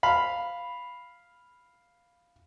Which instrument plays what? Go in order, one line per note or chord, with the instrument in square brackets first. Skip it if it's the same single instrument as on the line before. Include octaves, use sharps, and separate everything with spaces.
[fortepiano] F5 B5